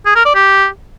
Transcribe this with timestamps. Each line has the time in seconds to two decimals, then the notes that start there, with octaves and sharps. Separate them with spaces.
0.06 G#4
0.15 A#4
0.25 D5
0.35 G4